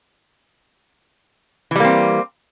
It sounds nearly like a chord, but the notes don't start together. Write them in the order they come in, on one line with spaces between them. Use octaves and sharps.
E3 G3 A#3 C4